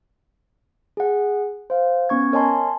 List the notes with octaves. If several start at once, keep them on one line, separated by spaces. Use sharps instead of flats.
G#4 F#5
C5 F5
B3 C#4 C#6 G#6
A#4 C#5 D#5 G#5 A5 C6